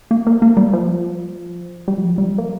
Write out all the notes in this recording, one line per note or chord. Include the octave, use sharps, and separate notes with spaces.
A#3
A#3
A#3
G3
F3
G3
F3
G3
A#3